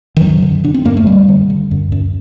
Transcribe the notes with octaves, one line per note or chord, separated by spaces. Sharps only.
D#3
F#2 F#3
D3
D3 D4
C4
F#2 A#3
A3
F#2 G3
D3
D3
F#2
F#2